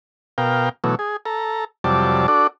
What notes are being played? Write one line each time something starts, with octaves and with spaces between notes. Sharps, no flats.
B2 A#4 F5 G5
B2 E3 F#3 A3
G#4
A4 A#5
F2 C3 F#3 G3 D5 A5
D4 F#4 A4 D5